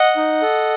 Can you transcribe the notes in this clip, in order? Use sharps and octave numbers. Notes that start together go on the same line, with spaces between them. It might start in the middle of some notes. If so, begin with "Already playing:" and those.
Already playing: D#5 F#5
D#4
A4